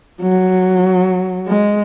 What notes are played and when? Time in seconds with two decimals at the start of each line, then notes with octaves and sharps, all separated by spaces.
0.22 F#3
1.47 G#3